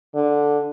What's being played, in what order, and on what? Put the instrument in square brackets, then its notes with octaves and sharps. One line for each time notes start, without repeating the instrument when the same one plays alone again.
[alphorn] D3